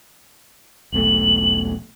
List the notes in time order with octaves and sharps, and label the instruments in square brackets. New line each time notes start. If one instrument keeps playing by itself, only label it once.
[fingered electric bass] E1 B1 A3 [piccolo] F#7